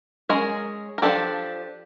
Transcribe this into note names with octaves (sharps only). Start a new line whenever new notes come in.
G#3 C#4 G#4 A#4
A#4
F3 A3 D4 G4 A4